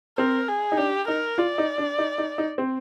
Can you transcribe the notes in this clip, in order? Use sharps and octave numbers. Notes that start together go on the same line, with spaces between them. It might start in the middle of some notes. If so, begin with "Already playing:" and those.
C4 A#4
G#4
D#4
D4 G4
D#4 A#4
F4 D5
D#4
D4
D#4
D#4
D#4
C4